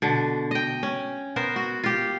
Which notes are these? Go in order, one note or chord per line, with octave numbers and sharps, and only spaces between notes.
B2 D3
D#5 G5
C#4
B3 A#4 C5
F#4
F4 G4